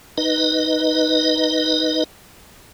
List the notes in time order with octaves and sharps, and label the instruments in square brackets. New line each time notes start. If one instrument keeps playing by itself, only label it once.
[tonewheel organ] D#4 B4 D#5